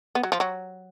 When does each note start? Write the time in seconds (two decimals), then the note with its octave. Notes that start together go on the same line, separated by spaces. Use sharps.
0.15 B3
0.23 F#3
0.32 F3
0.40 F#3